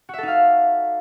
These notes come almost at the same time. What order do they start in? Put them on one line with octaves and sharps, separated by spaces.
F#4 E5 A4 D#4 F5